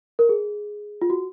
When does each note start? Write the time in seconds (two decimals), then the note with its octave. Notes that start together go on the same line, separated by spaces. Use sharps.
0.19 A#4
0.29 G#4
1.02 F4
1.10 F#4